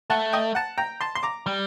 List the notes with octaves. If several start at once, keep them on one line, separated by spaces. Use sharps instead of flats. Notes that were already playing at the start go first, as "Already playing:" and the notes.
A3 F#5 A5
D#5 G5
F#5 A5
G5 A#5
A5 C6
C6
A#5 D6
G3